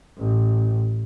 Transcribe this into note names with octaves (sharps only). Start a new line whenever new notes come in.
A1